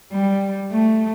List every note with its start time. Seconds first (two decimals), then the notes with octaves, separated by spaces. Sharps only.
0.12 G3
0.72 A3